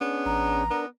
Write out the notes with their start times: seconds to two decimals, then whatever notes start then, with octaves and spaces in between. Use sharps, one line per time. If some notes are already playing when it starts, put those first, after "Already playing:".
0.01 B3 C#4 D4 G#4
0.26 A1 A#5
0.70 B3 D4 A#4